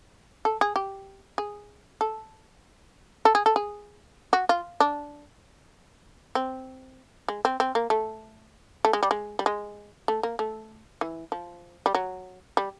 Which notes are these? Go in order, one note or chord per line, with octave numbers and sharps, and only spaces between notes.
A4
G#4
G4
G#4
A4
A4
G#4
A4
G#4
F#4
F4
D4
C4
G#3
C4
C4
A#3
A3
A3
G#3
G3
G#3
G3
G#3
A3
A#3
A3
E3
F3
G3
F#3
G3